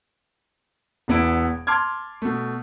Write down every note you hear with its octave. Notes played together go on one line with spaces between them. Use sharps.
E1 E2 B3 E4 D7
A5 C6 D6 F6 G#6
B2 A3